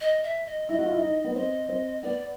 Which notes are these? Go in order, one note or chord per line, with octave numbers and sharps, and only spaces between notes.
D#5
E5
D#5
E4 D#5
F#4
F4
E4
D#4
B3
C4 D#5
C4
B3 D5